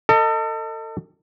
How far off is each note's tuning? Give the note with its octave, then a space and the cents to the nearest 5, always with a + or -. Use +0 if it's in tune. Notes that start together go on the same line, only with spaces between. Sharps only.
A4 +35 D#5 +0